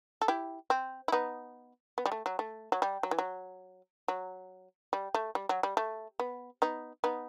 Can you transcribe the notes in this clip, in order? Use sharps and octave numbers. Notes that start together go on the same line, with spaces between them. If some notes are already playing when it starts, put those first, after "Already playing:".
A4
E4 G4
C4
E4
B3 D#4
B3
G3
A3
F#3
A3
F#3
G3
F#3
E3
F#3
F#3
G3
A3
G3
F#3
G3
A3
B3
B3 D#4
B3 D#4